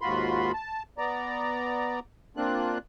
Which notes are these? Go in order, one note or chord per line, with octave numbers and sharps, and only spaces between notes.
D#2 G#2 F4 F#4 B5 C6
A5
B3 D5 A#5
A#3 C4 D4 F4 F#6